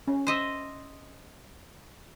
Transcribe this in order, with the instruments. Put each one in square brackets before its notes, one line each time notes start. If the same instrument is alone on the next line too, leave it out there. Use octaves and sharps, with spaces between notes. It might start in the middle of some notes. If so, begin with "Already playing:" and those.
[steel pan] C#4
[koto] C5 D#5 E5